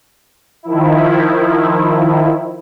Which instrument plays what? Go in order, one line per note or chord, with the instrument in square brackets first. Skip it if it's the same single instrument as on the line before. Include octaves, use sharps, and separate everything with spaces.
[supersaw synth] D#3 F3 E4